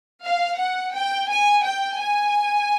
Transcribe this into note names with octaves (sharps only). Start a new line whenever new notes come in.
F5
F#5
G5
G#5
G5
G#5